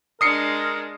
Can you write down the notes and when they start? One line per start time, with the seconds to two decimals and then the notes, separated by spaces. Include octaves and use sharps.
0.21 G#3 D4 A#4 D#6 C7 C#7